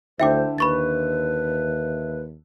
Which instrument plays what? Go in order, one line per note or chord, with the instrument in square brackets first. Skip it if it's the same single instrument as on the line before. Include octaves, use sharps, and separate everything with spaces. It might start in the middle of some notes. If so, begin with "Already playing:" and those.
[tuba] D2 [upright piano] D3 E4 [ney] C5 [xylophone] E5 G5 D6
[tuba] D#2 [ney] B4 [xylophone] B5 C#6 A6